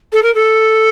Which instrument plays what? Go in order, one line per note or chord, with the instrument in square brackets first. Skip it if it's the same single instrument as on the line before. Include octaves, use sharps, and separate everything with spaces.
[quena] A4
A#4
A4